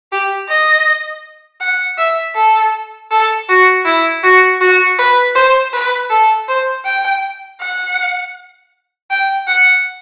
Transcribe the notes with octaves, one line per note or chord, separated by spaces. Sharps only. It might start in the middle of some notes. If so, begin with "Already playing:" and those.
G4
D#5
F#5
E5
A4
A4
F#4
E4
F#4
F#4
B4
C5
B4
A4
C5
G5
F#5
G5
F#5